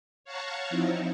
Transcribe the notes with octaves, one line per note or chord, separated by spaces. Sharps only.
C#5 F5 F#5 A5 A#5 C#6
F3 C4 D#4 E4